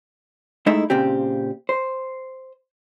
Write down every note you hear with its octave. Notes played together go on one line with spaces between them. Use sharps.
G#3 A3 D#4 E4 E5
A#2 C#3 C4 G4
C5